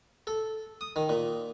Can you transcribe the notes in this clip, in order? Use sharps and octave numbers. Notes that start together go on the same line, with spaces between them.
A4
D#6
D#3
A#2